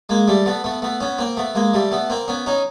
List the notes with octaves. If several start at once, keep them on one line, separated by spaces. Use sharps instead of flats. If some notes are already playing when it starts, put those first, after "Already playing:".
G#3 A#3
G3 A3
A3 B3
A3 B3
A3 B3
B3 C#4
A#3 C4
A3 B3
G#3 A#3
G3 A3
A3 B3
A#3 C4
B3 C#4
C#4 D#4